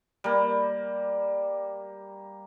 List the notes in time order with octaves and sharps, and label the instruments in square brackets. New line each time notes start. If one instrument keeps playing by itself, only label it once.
[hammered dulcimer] G3 A#3